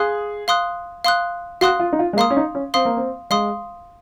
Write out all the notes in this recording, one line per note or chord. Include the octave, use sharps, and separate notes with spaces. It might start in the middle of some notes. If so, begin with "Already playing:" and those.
Already playing: G#4 F5 C6 D#6 F#6
F5 C6 D#6 F#6
F5 C6 D#6 F#6
F#4 F5 C6 D#6 F#6
F4
D#4
F4
G#3
A#3 F5 C6 D#6
C#4
D#4
C#4
C4 F5 C6 D#6
A#3
C4
G#3 F5 C6 D#6